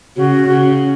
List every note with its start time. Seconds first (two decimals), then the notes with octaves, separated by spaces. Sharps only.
0.16 C#3 F#4
0.47 C#3